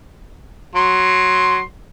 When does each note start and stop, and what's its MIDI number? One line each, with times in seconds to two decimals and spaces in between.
0.75 1.62 54
0.75 1.62 84